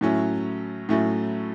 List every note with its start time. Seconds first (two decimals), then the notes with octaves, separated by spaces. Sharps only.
0.01 A2 F#3 A3 C#4 E4
0.89 A2 F#3 A3 C#4 E4